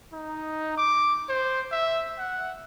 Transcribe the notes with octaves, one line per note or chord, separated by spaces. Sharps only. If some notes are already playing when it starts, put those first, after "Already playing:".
D#4
D6
C5
E5
F#5